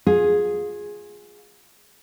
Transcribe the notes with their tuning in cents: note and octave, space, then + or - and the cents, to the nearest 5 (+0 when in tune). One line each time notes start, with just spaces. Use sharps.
F4 +25 G#4 +0